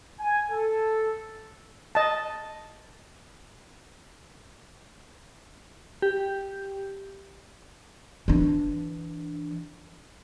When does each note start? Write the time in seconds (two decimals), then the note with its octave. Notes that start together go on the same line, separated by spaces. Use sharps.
0.19 G#5
0.50 A4
1.95 D#5 A5
6.02 G4
8.28 E3 D4